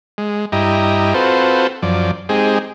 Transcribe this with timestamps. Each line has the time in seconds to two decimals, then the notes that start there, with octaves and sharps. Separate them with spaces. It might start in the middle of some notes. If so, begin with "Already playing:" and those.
0.18 G#3
0.52 G2 E4 G4 D#5 A#5
1.14 C4 F4 F#4 A4 B4 C5
1.83 F#2 F3 D5
2.29 G#3 C4 D#4 G4 G#4